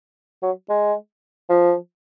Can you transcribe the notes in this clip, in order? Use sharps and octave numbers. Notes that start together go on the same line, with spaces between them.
F#3
G#3
F3